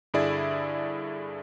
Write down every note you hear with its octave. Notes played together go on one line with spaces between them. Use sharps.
G2 D3 E4 G#4 D5 E5